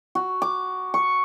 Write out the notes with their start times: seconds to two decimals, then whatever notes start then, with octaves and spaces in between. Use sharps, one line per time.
0.15 F#4
0.42 D6
0.94 C#6